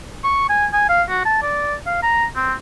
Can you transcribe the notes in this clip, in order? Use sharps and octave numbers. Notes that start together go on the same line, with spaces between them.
C#6
G#5
G#5
F5
F#4
A5
D5
F5
A#5
C4